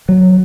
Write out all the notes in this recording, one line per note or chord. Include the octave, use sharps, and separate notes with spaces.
F#3